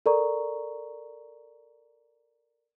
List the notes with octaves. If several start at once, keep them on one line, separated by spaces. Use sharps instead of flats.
A4 A#4 D5 A#5 C#6